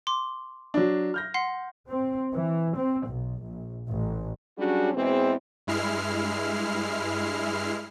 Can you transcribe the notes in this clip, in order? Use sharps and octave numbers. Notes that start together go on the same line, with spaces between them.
C6 D6
F#3 D4
F6 G6 A#6
F#5 C6 C7
C4
E3
C4
B1
A#1
A1
F#3 G3 C#4 D4 F#4 G#4
E2 B2 E3 G#3 C4
G2 G#3 E4 F6 C7